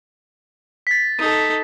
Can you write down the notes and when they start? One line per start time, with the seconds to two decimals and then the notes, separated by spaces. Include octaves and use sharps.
0.87 A6 B6
1.19 D#4 A4